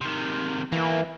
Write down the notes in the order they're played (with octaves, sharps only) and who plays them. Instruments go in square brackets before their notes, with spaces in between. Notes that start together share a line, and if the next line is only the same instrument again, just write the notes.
[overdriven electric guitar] C3 D#3
[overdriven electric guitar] E2 A#3 [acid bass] E3